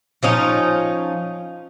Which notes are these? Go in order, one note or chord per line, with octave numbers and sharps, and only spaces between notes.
F3 C#4 D#4